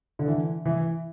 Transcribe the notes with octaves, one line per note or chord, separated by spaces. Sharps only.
D3
E3
E3